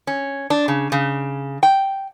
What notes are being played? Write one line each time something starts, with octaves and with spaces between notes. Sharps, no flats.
C#4
D4
C#3
C#3
G5